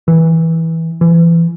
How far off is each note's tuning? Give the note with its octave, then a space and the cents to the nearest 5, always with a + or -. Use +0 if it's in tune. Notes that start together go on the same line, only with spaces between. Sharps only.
E3 -15
E3 +25